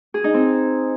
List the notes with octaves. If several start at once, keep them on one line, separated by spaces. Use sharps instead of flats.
G#4
D#4
C4